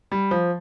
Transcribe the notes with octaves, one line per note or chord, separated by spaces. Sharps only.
G3
F3